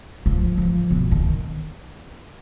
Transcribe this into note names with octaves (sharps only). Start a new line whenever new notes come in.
F3
F3
B2
D#3